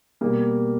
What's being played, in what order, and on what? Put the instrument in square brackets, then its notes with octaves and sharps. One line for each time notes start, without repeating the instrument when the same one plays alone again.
[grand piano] B2 G3 A#3